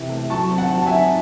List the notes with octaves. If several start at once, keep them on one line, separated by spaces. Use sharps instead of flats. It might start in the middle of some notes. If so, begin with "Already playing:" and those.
Already playing: C3 E3
A3
F#3 A5 C#6
C4
F#5 A5
F#3
A5
E5 G#5
D#4